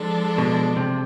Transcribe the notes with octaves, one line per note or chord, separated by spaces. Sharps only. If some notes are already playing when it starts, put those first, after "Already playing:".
Already playing: F3 G#3 D4 A4
B2
C3